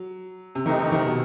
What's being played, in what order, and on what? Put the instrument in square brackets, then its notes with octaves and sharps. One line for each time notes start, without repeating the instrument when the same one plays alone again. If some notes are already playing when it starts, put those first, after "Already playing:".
Already playing: [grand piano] F#3
C3
[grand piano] D#3 [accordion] E3 A3 C4 D#4
[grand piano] C3
D#3
B2